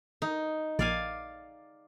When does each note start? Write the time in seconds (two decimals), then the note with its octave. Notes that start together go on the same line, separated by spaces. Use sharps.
0.22 D#4
0.79 A#1 D5 F5 G#5